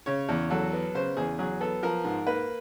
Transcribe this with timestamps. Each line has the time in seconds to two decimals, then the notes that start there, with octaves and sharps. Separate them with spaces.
0.06 C#3 C#5
0.29 E2
0.50 F#3 A4
0.73 B3
0.94 C#3 C5
1.17 E2 G#4
1.39 F#3 G#4
1.61 B3 A4
1.83 F3 A#4
2.04 G#2
2.27 A#3 B4